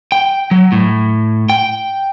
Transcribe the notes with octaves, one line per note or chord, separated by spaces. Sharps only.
G5
F#3
A2
G5